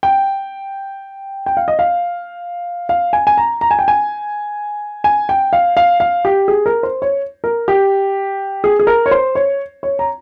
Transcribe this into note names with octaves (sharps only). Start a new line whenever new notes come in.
G5
G5
F5
D#5
F5
F5
G#5
G#5
A#5
A#5
G#5
G5
G#5
G#5
G5
F5
F5
F5
G4
G#4
A#4
C5
C#5
A#4
G4
G#4
G#4
A#4
C#5
C5
C#5
C#5
A#5